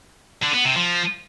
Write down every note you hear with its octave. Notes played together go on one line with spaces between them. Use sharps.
D3
B3
C3
F3